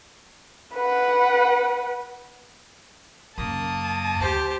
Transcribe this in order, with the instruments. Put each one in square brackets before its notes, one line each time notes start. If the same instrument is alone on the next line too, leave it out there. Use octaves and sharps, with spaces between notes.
[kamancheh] B4 F#5
[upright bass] F#2 C#3 [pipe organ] A#3 D#6 [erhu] A5
[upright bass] D2 [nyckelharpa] G4 C5